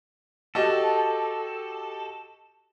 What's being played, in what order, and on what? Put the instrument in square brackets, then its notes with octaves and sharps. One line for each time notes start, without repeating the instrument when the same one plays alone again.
[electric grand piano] F#4 G4 D#5 [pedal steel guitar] A4